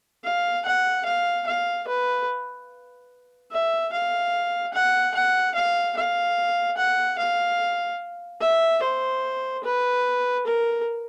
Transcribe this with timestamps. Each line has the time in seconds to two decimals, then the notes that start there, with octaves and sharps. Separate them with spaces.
0.24 F5
0.65 F#5
1.05 F5
1.47 F5
1.88 B4
3.52 E5
3.92 F5
4.73 F#5
5.14 F#5
5.55 F5
5.97 F5
6.78 F#5
7.18 F5
8.41 E5
8.83 C5
9.64 B4
10.46 A#4